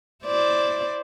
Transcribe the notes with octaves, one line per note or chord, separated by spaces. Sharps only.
E4 C5 D5